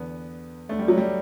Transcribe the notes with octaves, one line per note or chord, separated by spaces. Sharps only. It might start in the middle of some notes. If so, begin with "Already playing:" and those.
Already playing: E2 D3 B3
D2 D3 A3
G3
F#3
G3